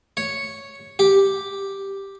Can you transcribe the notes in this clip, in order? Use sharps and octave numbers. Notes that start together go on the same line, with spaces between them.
C#5
G4